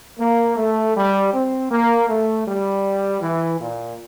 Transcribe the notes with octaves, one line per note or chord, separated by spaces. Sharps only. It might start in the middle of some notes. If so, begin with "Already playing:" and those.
A#3
A3
G3
C4
A#3
A3
G3
E3
A#2